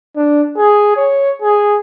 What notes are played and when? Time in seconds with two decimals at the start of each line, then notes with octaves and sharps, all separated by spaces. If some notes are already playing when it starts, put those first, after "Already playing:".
0.17 D4
0.58 G#4
0.97 C#5
1.42 G#4